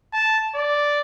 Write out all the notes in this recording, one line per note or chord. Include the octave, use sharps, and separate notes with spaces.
A5
D5